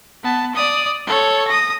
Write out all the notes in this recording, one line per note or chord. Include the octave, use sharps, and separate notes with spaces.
B3 A5
D5 D#6
A4 C#5
D#6 A#6